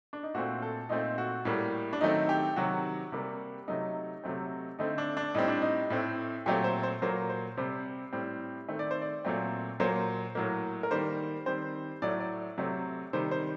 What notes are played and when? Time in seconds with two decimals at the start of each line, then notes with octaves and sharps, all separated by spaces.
0.13 D4
0.23 D#4
0.34 A#2 A3 C4 F#4
0.62 A4
0.89 A#2 A3 C4 D#4
1.18 F#4
1.45 A2 G3 A#3
1.93 D4
2.01 D#3 F#3 A3 C4 D#4
2.29 G4
2.56 C3 D#3 F#3 F#4
3.12 C3 G3 A#3
3.68 C3 F#3 A3 D#4
4.24 C3 F#3 A3 C4
4.79 D3 A3 C4 D#4
4.98 D4
5.17 D4
5.34 A2 G3 C4 D#4
5.48 D4
5.62 D#4
5.90 A2 A3 C4
6.46 A#2 F#3 A3 C4 G4
6.64 C5
6.83 C5
7.02 A#2 F#3 A#3 C5
7.29 C5
7.57 C3 G3 C4 C5
8.13 A2 G3 C4
8.69 D#3 A3 C4
8.79 D5
8.91 C5
9.02 D5
9.25 A#2 F#3 A3 C4
9.80 A#2 F#3 A#3 C5
10.35 A2 F#3 A#3
10.83 A#4
10.91 D#3 G3 A#3 C5
11.46 D#3 G3 C4 C5
12.02 A2 F#3 A3 D5
12.20 D5
12.58 C3 F#3 A3 C4
13.13 C3 D#3 G3 C5
13.31 C5